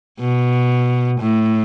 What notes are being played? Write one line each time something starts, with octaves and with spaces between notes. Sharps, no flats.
B2
A2